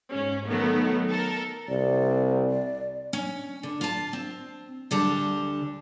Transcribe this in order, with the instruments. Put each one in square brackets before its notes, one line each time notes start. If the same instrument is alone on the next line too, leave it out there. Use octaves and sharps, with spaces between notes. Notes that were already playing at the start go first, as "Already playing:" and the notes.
[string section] G#2 C#4
D#3 F#3 A3 B3 A#4
A4 A#4
[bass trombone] C2 [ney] D5
[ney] D5
[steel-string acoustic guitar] C#4
D3
F4 A5
C4
D2 D3 G3 A5